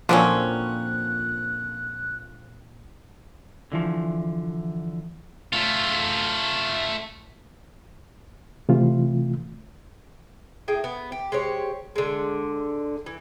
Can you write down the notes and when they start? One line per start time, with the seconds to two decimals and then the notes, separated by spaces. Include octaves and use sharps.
0.09 A#2 D3 F3 F#3 A#3 C4 C#4 F#6
3.72 D3 E3 F3
5.53 A3 F4
8.69 C3 E3 A3 F4
10.68 A2 G#4 G5
10.84 B3
11.12 G4
11.32 G#3 G4 C5 C#5
11.96 D3 G#3
13.06 E3